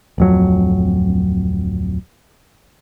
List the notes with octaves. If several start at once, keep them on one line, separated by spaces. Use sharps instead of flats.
D1 F2 F#3